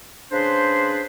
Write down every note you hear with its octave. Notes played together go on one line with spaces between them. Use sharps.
C#3 D4 G#4 B4 C5